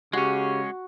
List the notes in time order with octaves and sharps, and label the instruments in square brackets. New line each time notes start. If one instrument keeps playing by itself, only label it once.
[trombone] C#3 [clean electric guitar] G#3 C#4 [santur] F#4 [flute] G4